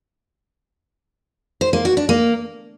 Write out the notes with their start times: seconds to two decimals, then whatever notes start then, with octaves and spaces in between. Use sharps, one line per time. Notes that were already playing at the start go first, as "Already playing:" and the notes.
1.61 C5
1.73 A#3
1.85 F#4
1.97 D4
2.09 A#3